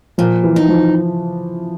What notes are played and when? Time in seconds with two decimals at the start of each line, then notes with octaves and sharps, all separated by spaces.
0.18 A#2 F3
0.44 E3
0.56 D#4
0.68 F3